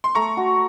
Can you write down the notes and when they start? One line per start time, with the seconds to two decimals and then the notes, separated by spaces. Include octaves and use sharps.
0.04 C6
0.15 A3 A#5 C#6
0.37 F#4